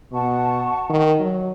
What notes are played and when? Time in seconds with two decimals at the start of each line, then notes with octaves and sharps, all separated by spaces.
0.12 B2 F#5 A5 C#6
0.90 D#3
1.20 F#3